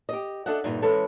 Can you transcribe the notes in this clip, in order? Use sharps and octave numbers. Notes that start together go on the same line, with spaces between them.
G4 D#5
D4 A4 D#5 E5 F#5
E2 G2 A#2 D#4 E5
E3 G#3 C#4 E4 G#4 A4